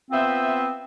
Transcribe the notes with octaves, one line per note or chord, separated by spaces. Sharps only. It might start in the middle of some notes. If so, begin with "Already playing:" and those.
B3 C4 F4 C5 E5